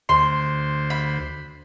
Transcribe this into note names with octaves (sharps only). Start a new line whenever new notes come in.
D2 C5 C6
B5